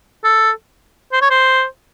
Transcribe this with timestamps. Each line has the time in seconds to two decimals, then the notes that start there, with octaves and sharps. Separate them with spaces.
0.24 A4
1.13 C5
1.22 C#5
1.30 C5